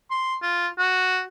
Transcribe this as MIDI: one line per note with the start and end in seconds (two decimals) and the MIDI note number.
0.11 0.35 84
0.42 0.68 65
0.79 1.23 66